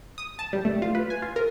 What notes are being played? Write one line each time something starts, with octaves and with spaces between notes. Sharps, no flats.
D#6
A5
G3
A3
F4
B4
G#5
F4
A#4